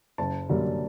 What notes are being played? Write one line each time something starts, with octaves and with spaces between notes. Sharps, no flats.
F#1 A5
F#2 D3 G3 A#3